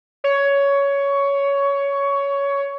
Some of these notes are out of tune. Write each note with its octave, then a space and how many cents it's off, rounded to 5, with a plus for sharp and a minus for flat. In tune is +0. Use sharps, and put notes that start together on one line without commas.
C#5 +15